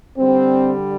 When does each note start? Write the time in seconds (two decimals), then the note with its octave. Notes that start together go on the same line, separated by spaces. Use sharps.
0.17 D3 G3 C4